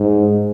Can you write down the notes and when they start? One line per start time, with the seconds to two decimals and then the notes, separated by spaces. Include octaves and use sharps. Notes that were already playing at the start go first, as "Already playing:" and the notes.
Already playing: G#2